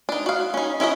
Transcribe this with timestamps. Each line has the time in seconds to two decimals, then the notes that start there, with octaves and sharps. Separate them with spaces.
0.09 D4 D#4
0.26 F#4 F5
0.54 C#4 D#4
0.80 C#4 E4 F#4 D#5